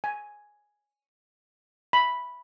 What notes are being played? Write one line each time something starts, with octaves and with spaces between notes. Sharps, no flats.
G#5
B5